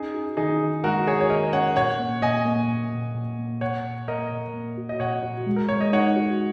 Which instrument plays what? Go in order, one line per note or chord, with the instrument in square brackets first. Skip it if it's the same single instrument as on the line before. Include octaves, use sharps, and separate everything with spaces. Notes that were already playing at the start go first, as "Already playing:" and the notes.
Already playing: [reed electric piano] C#4 [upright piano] D#4 G#4
[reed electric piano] F#4
[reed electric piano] D#3 [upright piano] D#4 G#4
[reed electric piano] D#3
[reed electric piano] G#3 [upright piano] F#4 A#4
[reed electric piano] F#4 [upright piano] G#4 C#5
[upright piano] C#5
[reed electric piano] D#3 [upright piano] A#4 D#5
[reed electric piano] C#4 [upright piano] C#5 F#5
[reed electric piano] A#2 [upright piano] C#5 F#5
[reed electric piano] A#3
[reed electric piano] A#2 [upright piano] D#5 G#5
[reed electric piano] A#3
A#2
A#2
A#2
A#3
[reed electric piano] A#2 [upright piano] C#5 F#5
[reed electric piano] A#2
[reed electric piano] A#3 [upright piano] A#4 D#5
[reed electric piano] A#2
A#3
F#4
[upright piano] D#5
[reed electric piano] A#2 [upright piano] C#5 F#5
[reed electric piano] F#4
G#3
[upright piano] A#4
[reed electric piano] G#3 [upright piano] C#5
[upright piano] D#5
[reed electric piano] D#4 [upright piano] C#5 F#5
[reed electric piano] F#4